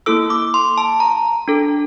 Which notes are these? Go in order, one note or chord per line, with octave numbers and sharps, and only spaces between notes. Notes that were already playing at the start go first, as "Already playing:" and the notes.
A#3 E4 A4 E6
D6
C6
A5
A#5
D4 A4